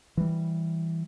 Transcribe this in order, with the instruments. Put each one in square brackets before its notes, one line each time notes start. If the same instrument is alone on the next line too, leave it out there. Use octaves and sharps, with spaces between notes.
[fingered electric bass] E3 G3